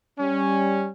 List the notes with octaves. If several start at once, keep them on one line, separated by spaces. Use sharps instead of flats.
G3 C#4